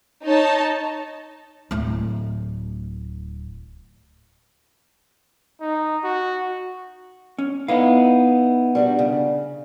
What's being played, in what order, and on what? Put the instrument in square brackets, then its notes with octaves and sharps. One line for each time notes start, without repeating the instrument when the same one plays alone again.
[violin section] D#4 C#5 A5
[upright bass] D1 A3
[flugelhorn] D#4
F#4
[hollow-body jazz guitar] C#4
[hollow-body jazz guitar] B3 F5 [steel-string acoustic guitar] D#4 E4
[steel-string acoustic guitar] G3 D4 F#4
C#3